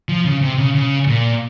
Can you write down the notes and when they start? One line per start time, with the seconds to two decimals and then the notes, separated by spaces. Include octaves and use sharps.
0.09 F3
0.25 C#3
0.42 C3
0.58 C#3
0.75 C#3
1.08 A#2